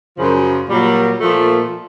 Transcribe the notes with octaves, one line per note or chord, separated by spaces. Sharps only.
F#2 C#3 F3
A#2 F#3 G3
A#2 F3 A3